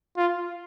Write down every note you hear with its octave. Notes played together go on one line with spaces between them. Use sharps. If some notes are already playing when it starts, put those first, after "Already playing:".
F4